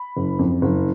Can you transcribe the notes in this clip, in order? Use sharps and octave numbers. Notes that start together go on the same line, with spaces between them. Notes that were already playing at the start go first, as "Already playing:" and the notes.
Already playing: B5
F#1
F2
F#1